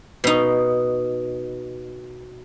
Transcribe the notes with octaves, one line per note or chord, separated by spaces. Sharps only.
B2 D#4